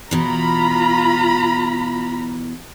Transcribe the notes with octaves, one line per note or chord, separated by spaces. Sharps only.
B2 E3 F4 A#5 B5